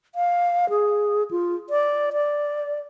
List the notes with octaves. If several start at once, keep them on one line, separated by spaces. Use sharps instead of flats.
F5
G#4
F4
D5
D5